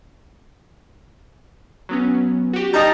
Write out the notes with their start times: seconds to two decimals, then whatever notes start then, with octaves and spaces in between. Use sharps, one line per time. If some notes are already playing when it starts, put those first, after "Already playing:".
1.89 F#3 B3 C#4
2.53 F#4 G4
2.73 G3 D#4 A5 A#5 A6